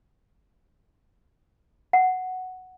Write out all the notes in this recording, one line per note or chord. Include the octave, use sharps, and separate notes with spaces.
F#5